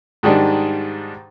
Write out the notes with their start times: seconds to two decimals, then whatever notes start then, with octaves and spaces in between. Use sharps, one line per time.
0.23 G#2 D#3 G3 D4 D#4